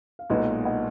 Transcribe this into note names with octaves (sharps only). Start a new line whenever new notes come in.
F5
B1 A#2 G#3 D#4 F#4 B4 D#5
D#5 F#5